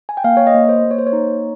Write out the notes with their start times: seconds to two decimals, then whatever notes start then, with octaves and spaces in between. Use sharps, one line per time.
0.09 G#5
0.17 G5
0.24 A#3 F5
0.37 C#5
0.47 D#5
0.54 A#3
0.69 C5
0.84 A#3
0.91 C#5
0.98 C5
1.07 C#5
1.13 D#4